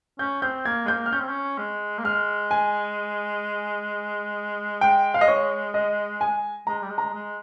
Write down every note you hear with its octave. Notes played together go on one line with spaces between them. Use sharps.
C#4 G6
C4 G6
A#3 G#6
G#3
A#3 G6
F6
C#4 G6
C4
C#4
G#3
A#3
G#3 F6
G#5
G#3 G5
F5
D#5
C#5
D#5
G#5
G#3 A#5
G3
G#3
A#5
G#3